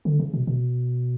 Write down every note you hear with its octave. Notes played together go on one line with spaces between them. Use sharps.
D3
C#3
B2
B2